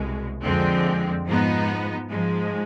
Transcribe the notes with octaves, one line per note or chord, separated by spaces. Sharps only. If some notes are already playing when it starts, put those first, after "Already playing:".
Already playing: C2 B2 G#3
F2 D3 F3 G#3 C4
G#2 F3 B3 D#4
G#2 F3 G#3